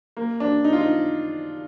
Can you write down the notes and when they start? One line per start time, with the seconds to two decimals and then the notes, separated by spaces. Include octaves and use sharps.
0.17 A#3
0.40 D4
0.64 D#4
0.73 F4
0.81 D#4